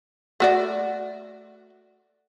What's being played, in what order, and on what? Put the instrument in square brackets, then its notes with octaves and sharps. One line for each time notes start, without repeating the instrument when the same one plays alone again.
[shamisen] A3 F#4 D5